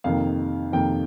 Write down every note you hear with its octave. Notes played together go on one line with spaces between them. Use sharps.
F2 C3 D#3 A#3 F5
F2 C3 D#3 A#3 G5